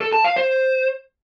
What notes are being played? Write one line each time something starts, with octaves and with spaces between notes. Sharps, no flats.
A4
A5
F5
C5